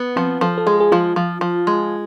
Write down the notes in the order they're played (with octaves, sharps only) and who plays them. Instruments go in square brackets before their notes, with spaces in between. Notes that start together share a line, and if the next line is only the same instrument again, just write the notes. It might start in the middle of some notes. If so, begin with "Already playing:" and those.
Already playing: [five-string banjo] B3
[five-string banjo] F3 [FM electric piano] C4
[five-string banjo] F3 [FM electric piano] A4
[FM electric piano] A4
[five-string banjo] G#3 [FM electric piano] G#4
[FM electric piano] G#4
[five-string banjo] F3 [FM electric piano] F4
[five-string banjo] F3
F3
G#3